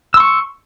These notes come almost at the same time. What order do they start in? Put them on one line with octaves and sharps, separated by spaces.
E6 C6 C#6